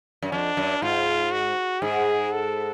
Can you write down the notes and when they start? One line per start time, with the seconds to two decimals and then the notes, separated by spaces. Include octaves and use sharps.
0.22 F#2
0.32 F2 D4
0.57 F#2
0.82 G#2 F4
1.32 F#4
1.82 G#2 G#4
2.33 A4